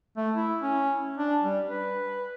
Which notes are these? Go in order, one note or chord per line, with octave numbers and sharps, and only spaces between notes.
A3
E4
C#4
D4
G3
B4